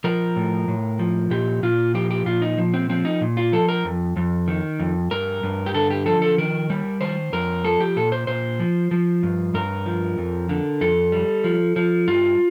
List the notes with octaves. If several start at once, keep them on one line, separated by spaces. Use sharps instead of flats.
F3 A#4
A2
A2
F3
A#2 G4
A#2 F4
F3 G4
G4
A#2 F4
D#4
F3
C4
F3 C4
D#4
A#2
F4
F3 A4
A#4
F2
F2
D#3
F2
G2 A#4
G2
G4
D3 A4
G4
F3 A4
A4
D#3 A#4
G3
D#3 C5
F2 A#4
F3 A4
G4
A#2 A4
C5
A#2 C5
F3
F3
G2
G2 A#4
F3
F2
D3
F2 A4
G3
F3
F3
G2 F4